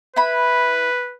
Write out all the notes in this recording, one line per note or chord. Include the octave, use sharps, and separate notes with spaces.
E4 B4 B5